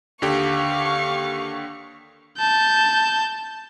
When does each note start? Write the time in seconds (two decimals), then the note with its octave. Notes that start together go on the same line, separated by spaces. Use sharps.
0.22 D#2 D3 G4 F5 C#6
2.38 A5 G6